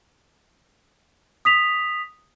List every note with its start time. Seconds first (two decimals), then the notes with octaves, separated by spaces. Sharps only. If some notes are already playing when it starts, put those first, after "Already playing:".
1.45 D#6 B6 F7